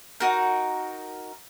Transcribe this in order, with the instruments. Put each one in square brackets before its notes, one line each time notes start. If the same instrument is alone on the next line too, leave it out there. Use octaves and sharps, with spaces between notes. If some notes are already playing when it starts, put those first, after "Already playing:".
[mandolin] D#4 F#4 A#4